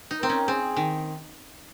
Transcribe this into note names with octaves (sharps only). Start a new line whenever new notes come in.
D#4
C4 A#4
C#4
C4 G#4
D#3